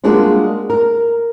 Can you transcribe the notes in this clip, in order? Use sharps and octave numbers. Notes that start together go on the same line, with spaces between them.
G3 G#3 A#3 D4 F4 F#4
A#4